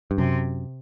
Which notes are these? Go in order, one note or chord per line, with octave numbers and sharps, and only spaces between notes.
G2
F#2 C3